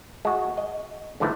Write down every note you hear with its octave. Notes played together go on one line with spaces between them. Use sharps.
G#3 F#4
D#5
G#2 D3 E3 F3 A3 E4